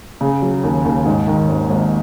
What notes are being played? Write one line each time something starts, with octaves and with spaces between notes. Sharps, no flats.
C#3
F#3
D#2
D#2
G#2
D#3
G#1
G#1